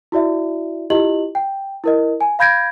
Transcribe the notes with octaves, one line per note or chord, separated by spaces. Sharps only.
E4 F#4 D5 E5
E4 F4 G4 D#5 F#7
G5
E4 A#4 D#5
G#5
F5 B5 G6 G#6 A#6 D7